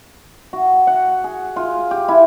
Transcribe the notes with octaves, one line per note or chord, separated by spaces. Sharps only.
F#4
F#5
G#4
F4
G4
E4